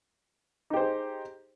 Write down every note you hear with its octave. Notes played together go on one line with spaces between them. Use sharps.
D#4 G4 G#4 C5